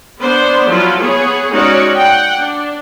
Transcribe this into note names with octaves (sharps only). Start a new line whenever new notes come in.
B3 D4 C5
F3 F#3 E4 F4
B3 G#4 C#5
G#3 C#4 D#4 F#4 C#5 D5
F#5 G5
D4